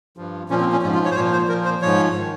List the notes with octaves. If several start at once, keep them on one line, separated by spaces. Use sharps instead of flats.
G2 F3
A#2 F3 C#4
C4
C#4
G#2 F3 C#4
F4
C#5
C5
A#2 F3 C#5
C5
A#2 F3 A#4
C5
G#2 F3 C#5
D#3